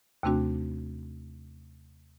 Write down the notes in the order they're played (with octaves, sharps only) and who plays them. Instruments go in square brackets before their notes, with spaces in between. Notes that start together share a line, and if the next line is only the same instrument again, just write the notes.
[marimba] D#2 C3 A3 C4 D4 F#4